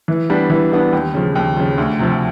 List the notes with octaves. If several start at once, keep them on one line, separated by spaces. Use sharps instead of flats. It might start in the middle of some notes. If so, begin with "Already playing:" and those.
E3
G3 B3 D4
E3
G3 B3 D4
D#2
C#3 F3
D#2
C#3 F3
D2
C3 F3